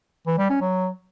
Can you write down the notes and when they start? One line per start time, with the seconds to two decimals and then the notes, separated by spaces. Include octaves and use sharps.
0.26 E3
0.38 G3
0.49 C#4
0.61 F#3